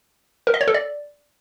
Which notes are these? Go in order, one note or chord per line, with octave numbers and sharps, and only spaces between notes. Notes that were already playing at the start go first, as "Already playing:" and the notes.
A#4
D#5
C#5
A4
D5